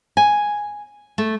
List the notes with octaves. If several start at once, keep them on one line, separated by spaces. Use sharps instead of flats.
G#5
A3